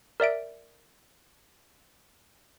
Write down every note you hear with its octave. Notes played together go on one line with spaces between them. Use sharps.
A#4 D5 E5 D7